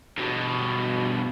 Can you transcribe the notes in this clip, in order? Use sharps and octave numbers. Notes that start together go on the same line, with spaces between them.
G2 B2